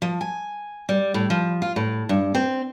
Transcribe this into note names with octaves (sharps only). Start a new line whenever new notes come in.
F3
G#5
G3
A2
F3
F4
A2
G2
C4